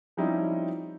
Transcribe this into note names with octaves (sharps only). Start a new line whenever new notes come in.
F3 G3 C4 C#4 D#4 E4